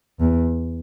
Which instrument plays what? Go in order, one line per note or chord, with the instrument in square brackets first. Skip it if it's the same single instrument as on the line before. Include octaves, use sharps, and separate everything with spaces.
[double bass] E2